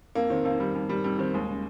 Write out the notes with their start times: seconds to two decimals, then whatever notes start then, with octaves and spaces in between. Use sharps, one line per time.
0.15 F2 A#3
0.30 D#3 C4
0.45 F2 A#3
0.60 D#3 G3
0.75 F2 G3
0.89 D#3 G3
1.04 F2 G3
1.19 D#3 C4
1.34 D#2 G#3
1.50 C#3